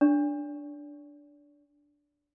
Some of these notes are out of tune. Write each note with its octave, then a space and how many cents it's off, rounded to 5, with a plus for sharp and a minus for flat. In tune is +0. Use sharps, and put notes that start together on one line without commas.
D4 +0 D5 -40